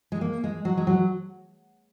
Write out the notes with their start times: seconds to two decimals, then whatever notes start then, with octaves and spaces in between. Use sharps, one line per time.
0.12 G#3
0.21 A#3
0.44 G#3
0.65 F#3
0.77 G#3
0.87 F#3